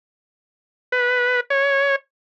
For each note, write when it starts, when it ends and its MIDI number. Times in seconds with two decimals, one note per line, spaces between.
0.92 1.40 71
1.50 1.96 73